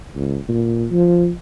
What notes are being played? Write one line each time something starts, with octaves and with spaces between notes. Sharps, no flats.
C#2
A#2
F3